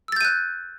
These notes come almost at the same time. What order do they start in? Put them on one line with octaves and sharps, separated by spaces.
E6 A6 G6 D#7 F#6